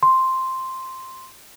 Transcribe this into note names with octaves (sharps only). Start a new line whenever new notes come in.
C6